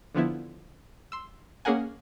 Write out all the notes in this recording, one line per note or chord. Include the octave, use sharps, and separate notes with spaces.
D3 F3 B3 E4
C6 E6
A#3 C#4 G#4 A#4 F#5 G#5